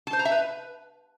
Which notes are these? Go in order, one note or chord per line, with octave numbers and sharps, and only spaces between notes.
A5
C5
A#5
E5
B4